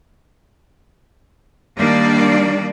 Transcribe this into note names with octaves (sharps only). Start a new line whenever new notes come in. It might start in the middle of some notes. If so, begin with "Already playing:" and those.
D#3 G3 A#3 D4 D5